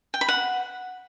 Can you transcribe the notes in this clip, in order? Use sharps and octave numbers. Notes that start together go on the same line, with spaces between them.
G5
B5
F#5